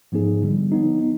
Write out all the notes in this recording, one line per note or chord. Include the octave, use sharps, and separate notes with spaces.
G#2 F3 B3 D#4 G#4
D3 G3 B3
F3 B3 D#4
D#4